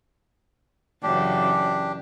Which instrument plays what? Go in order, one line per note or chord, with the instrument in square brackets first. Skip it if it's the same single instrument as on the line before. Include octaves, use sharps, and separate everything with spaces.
[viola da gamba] F#2 C#3 E3 [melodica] D4 G4